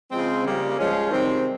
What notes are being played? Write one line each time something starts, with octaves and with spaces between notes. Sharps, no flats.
C#3 F3 G#3 C4
C#3 G3 A#3
F3 G#3 C#4
C3 D#3 G3 C4